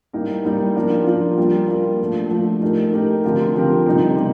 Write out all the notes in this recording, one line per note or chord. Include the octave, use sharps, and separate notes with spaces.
A2 G3 A#3 D#4 A#4
A2 G3 A#3 D#4 A#4
F3 A#3 D4 F4 A#4
F3 A#3 D4 F4 A#4
G3 A#3 F4 A#4
G3 A#3 F4 A#4
F3 A3 D4
F3 A3 D4
A3 D#4 G4 A#4
A3 D#4 G4 A#4
D3 F3 C4 G4 A#4
D3 F3 C4 G4 A#4
C3 G3 A#3 D#4
C3 G3 A#3